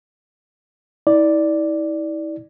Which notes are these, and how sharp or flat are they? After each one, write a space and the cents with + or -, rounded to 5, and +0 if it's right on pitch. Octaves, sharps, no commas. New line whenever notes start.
E4 -40 D5 +0